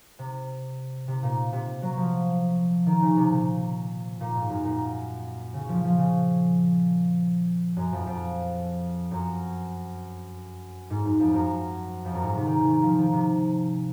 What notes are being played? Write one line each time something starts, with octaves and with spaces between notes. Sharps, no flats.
C3
C3
A#2
C3
F#3
F3
D#3
C#3
C3
A#2
A#2
G#2
F#2
A#2
C#3
F3
F3
C#3
F#2
F2
F2
F#2
G#2
F#2
F2
F#2
F2
F#2
G#2
C3
D#3
C#3
D#3
F3
D#3
C3